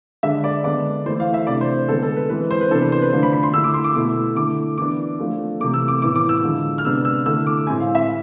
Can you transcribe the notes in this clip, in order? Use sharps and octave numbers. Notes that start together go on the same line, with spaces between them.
D3 G#3 D4 E5
D5
D3 G#3 B3 D4 D5
E3 A3 E4 C5
F5
E5
C3 E3 A3 D4 D5
C5
D3 G#3 B3 A4
A4
B4
E3 G#3 C4 E4 B4
C5
B4
C3 E3 B3 D4 A4
B4
C5
B4
D3 F3 A3 D4 C5
B5
B5
C6
D3 A3 E4 E6
D6
C6
D6
B2 A3 E4
D3 A3 E4 D6
E3 B3 D4 D6
F3 A3 D4
C3 E3 A3 D6
E6
D6
A2 E3 B3 E4 D6
D6
E6
D3 F3 G#3
F6
C3 G#3 B3 D4 E6
E6
D3 A3 E4 E6
D6
A2 G#3 C4 E4 G#5
F5
E5